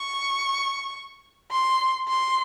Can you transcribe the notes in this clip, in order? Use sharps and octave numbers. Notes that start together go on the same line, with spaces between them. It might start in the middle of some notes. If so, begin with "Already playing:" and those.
Already playing: C#6
C6
C6